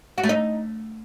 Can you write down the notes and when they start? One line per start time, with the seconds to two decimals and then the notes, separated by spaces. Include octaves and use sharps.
0.18 F#4
0.23 A3
0.29 D#4